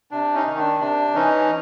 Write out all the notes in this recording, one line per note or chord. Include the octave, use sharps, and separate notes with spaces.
C3 D4
C#4 D#4
D#3
D4
C3 D4
E3 C#4 D#4